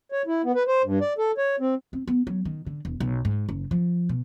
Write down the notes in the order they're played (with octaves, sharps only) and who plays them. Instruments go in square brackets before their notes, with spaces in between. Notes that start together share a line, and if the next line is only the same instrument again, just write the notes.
[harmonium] C#5
E4
B3
B4
C5
G2
D5
A4
C#5
C4
[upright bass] C4
B3
F#3
D#3
D3
E1
B1
G#2
F#1
F3
B2